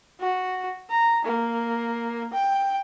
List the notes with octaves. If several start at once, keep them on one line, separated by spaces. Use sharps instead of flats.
F#4
A#5
A#3
G5